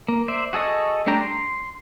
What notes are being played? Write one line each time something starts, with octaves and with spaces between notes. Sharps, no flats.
A#3
C5 D5 E5
F#4 G#4 A4 D#5 C#6
G3 A3 D4 G5 A#5
C6